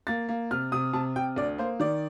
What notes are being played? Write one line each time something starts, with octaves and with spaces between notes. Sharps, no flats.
A#3 A6
A#3
C3 F6
C3 D#6
C3 A5
C3 G5
D2 D5
A#3 C5
D#3 D5